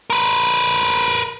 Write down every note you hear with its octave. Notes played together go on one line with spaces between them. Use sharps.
A#4 B4